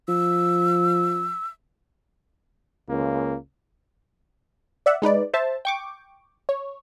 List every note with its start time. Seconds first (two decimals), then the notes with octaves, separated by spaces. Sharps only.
0.08 F3 E6
2.89 C#2 A#3
4.86 D5 E5 F#5
5.02 G#3 D#4 B4 D5
5.34 C5 E5 A5
5.65 G5 C#6 D6
6.49 C#5